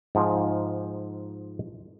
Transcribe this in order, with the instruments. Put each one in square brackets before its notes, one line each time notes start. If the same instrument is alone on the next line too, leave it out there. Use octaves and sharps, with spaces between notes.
[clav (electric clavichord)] G#2 F3